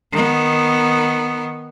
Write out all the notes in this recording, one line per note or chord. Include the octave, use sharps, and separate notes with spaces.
D#3 B3